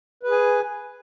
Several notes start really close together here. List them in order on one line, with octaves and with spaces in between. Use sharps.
B4 G#4 G#5